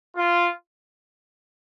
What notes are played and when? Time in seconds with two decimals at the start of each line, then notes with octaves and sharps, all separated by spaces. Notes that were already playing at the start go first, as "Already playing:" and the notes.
0.16 F4